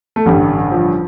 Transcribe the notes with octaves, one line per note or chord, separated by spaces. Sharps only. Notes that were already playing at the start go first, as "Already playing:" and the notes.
A3
A1 G2 D3 G3
F3